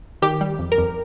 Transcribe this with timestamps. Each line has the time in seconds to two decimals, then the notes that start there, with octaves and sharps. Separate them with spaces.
0.22 D#3 G4
0.41 G3
0.59 F2
0.72 A#4
0.78 F2